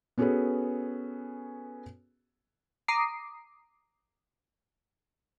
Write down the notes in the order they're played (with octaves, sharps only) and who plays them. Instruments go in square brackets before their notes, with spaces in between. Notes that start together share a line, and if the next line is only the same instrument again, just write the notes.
[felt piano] B3 C#4 F#4 G#4 A4 B4
[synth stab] A#5 D6 D#6 C7